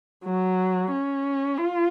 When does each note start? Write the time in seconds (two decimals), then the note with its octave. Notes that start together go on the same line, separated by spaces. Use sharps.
0.25 F#3
0.91 C#4
1.58 F4